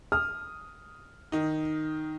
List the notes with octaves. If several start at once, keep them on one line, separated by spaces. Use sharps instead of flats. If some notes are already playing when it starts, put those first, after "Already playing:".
D#6 F6
D#3 D#4